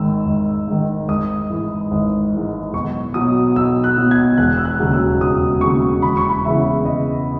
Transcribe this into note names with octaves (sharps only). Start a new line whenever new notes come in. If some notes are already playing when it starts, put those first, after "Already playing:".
Already playing: G#1 G#2 D#3 E6
G#1
G#2 D#3
G#1 D#6
G#2 E3
G#1
G#2 E3
B1 C#6
B2 F#3 D#6
B1 E6
F#6
B2 F#3
G#6
E1 F#6
E6
F#6
D#2 C#3 F#3
E6
E1 D#6
D#2 C#3 F#3 C#6
E1 B5
C#6
B5
E2 C#3 E3 E5
E1 D#5